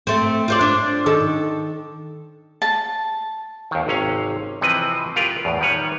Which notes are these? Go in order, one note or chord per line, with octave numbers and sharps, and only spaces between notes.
A3 C4
F4 C5 D5
D4
D#3 A4
A5
D#2 D#3
G#1 C3 C#4 F5
C3 E3 F3 C4 B4 D#5
F4 G4 A#4 B4 F5
E2 A2
D#3 G3 B4 C#5